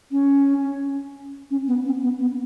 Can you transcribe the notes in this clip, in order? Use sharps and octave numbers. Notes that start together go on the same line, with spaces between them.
C#4
C#4
B3
C#4
B3
B3